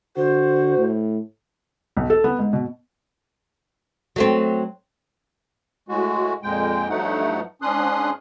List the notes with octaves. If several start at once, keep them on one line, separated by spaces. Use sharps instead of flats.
D3 F#4 C5
A2
B1
A4
B3
G#2
B2
F#3 A3 C4
A2 G#3 F#4
F2 A#2 G#3 G5
G2 F3 F#3 A3 D#4 F#5
G#2 C#4 D4 C6 D#6 F#6